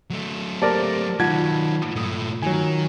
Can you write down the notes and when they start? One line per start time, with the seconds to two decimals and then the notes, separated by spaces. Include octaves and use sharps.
0.10 F#3 A3
0.62 A#3 G4 A#4 C5 D5 A5
1.20 D#3 F#3 D#4 F4 F#5 A5 G#6
1.96 G2 A#2 A3 D#6
2.42 D#3 F#3 G#5